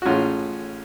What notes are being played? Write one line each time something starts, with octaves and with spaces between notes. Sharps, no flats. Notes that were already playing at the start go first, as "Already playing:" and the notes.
F#4
A1 A2 G#3 C#4 F4